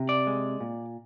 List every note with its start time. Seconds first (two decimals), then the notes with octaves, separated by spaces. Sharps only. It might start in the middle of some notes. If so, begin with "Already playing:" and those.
Already playing: C3
0.09 D5
0.27 G#3
0.60 A#2